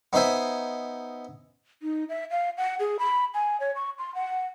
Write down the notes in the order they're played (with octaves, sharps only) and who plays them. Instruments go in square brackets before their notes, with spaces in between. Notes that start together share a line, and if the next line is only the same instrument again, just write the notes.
[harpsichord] B3 D#4 C5 E5 G#5
[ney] D#4
E5
F5
F#5
G#4
B5
G#5
C#5
C#6
C6
F#5